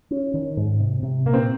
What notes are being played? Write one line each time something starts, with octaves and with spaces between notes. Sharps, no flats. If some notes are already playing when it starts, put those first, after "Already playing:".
C#4
D#3
G#2
C3
C3
A#2 A#3
C4